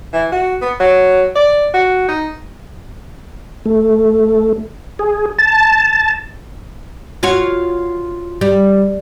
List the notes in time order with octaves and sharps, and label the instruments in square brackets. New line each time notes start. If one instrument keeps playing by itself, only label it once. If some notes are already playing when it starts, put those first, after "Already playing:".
[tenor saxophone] E3
F#4
B3
F#3
D5
F#4
D#4
[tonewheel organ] A3
G#4
A5
[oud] F4 F#4 C#5
G3